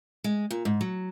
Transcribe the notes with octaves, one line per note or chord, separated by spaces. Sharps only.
G#3
A#2
G#2
F#3